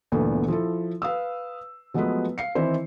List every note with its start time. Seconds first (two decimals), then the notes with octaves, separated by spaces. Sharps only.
0.12 G1 D2 A#2 E3 B3 D4
0.48 F3 E4 A4
1.02 B4 F5 D#6 E6
1.94 F3 F#3 G#3 A3 B3 B4
2.38 F5 C7 C#7
2.55 D#3 E3 C4 E4 C5